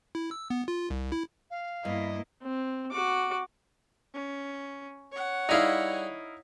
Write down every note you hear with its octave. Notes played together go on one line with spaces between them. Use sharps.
E4
E6
B3
F4
C2
E4
F5
G2 A#3 B3 E4 D#5
C4
F#4 D6
C#4
C#5 F#5
G3 D#4 E4 G#4 F5